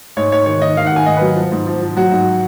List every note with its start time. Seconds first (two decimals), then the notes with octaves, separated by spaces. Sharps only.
0.17 G#2 C#5
0.32 G#2 C#5
0.46 D#3 C#5
0.62 D#3 D#5
0.77 D#3 F5
0.86 F#5
0.92 D#3 G#5
1.06 G#2 D#5
1.16 B4
1.21 F#3
1.36 F3
1.52 G#2
1.67 F3
1.82 F3
1.97 F#3 F#4
2.11 G#2